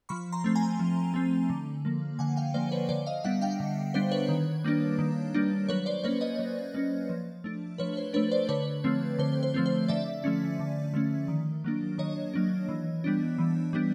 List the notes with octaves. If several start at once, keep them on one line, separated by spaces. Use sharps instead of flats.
F3 B5 C#6
A#5 C6
A3 C4
G#5 A#5
F3
A3 C4
D3
F3 A#3
D3 F#5 G#5
F5 G5
F3 A#3 C5 D5
B4 C#5
D3 C5 D5
D#5 F5
G3 B3 D4 E5 F#5
F5 G5
D3
G3 B3 D4 C5
B4 C#5
D#3
G3 A#3 D4
D#3
G3 A#3 D4
F#3 B4 C#5
C5 D5
A#3 C#4 B4 C#5
C#5 D#5
F#3
A#3 C#4
F3
A3 D4
F3 B4 C#5
C5
A3 D4 B4 C#5
C5 D5
D3 B4 C#5
F3 A3 C4
D3 C5
C5
F3 A3 C4
C5
D3 D5 E5
F3 A3 C#4
D3
F3 A3 C#4
D#3
F#3 A#3 D4
D#3 C#5 D#5
F#3 A#3 D4
E3
G3 B3 D4
E3
G3 B3 D4